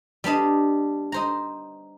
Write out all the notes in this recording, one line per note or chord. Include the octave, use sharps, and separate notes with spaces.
G3 B3 D4 D#5
D#4 C5 A#5